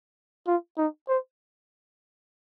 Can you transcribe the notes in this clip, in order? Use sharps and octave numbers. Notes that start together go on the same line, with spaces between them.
F4
D#4
C5